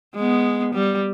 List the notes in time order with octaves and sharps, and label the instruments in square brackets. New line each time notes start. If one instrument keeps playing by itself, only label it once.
[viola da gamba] G#3 B3
G3